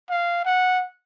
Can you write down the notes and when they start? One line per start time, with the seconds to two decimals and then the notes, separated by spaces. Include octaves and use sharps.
0.10 F5
0.45 F#5